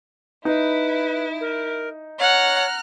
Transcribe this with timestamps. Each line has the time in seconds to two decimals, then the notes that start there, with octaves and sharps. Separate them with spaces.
0.45 D#4 E4 B4
1.40 A#4
2.19 C#5 F#5 A#5 F6 F#6